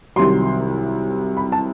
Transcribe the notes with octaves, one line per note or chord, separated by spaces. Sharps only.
C2 C3 D#3 F#3 C6
B5
A5